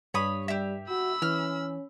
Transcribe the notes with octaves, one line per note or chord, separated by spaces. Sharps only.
G2 C#5 B5 D#6
G3 G4 E5
F#4 B5 E6
E3 C#4 F6